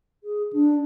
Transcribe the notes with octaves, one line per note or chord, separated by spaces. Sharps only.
G#4
D4